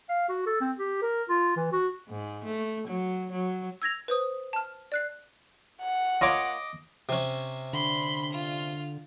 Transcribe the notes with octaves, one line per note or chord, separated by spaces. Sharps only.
F5
F#4
A4
C4
G4
A#4
F4
E3
F#4
G#2
A3
F#3
F#3
E6 G#6 A#6 F7
B4 C5 D#6
A5 F6
D5 F#6 C7
F#5
A#3 F4 C#5 D#5 D6
C3 C#4
D3 B5 C6
F4